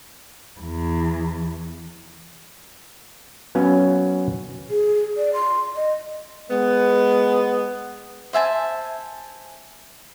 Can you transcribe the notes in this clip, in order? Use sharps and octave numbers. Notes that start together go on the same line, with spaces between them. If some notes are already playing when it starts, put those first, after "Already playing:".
E2
F#3 B3 C#4 F5
G#4
D5
C6
D#5
G#3 B3
C5 E5 G#5 A5